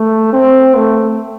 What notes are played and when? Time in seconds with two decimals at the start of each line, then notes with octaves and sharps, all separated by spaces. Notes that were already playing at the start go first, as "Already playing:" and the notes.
Already playing: A3
0.33 C4
0.76 A3